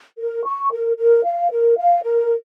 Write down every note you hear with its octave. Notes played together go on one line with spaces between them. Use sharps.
A#4
C#6
A#4
A#4
F5
A#4
F5
A#4